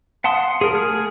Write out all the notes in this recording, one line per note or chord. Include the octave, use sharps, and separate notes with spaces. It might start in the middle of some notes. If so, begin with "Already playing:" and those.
F5 F#5 A5 C6 D#6
G#4 A#4
A3 G#4 F6